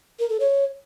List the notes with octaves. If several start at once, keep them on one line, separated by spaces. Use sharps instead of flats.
A#4
A4
C#5